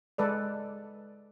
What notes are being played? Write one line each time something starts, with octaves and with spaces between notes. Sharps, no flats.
G#3 A4 B4 D5